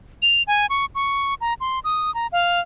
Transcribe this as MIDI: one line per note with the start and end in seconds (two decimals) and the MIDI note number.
0.22 0.43 101
0.47 0.66 80
0.70 0.85 85
0.95 1.34 85
1.41 1.54 82
1.60 1.79 84
1.84 2.14 87
2.15 2.27 82
2.32 2.60 77